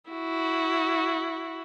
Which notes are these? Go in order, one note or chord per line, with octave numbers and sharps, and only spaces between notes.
E4 F#4